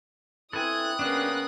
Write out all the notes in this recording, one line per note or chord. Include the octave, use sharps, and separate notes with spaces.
C4 E4 A4 B4 G#5 D#6 F#6
C#3 A#3 B3 D4 G4